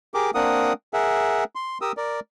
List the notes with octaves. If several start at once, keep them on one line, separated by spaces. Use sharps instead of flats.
G4 G#4 A#4 D6
A#3 C4 D4 A#4 F#5 D#6
G#4 A#4 E5 F#5
C6
G4 A#4 D#6 E6
A#4 D5